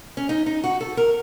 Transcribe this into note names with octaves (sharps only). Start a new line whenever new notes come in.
C#4
D#4
D#4
F#4
A4
A#4